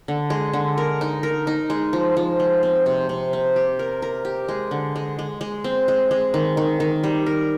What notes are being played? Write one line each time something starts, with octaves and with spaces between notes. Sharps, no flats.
D3
G#3
D3
A#4
D#4
A#4
D#4
G#3
F3
F3
G#3
C4
C3
C3
C4
G4
A#4
A#4
G4
G#3
D3
G#3
G#3
G#3
C4
G#3
G#3
D#3
D#3
D#3
G3
A#4